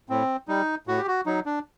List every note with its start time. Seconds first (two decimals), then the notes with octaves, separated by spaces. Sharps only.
0.09 A2 C4
0.48 G3 D#4
0.87 A2 F#4
0.98 G4
1.07 F#4
1.26 F#3 D#4
1.46 D4